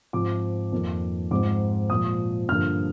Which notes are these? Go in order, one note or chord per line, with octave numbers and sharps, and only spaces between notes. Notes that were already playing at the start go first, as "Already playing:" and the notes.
G#2 F3 C4 D6
F2 D#3 A#3
G#2 F3 G#3 C4 D6
A#2 F3 G#3 D#6
G2 D3 F3 A#3 F6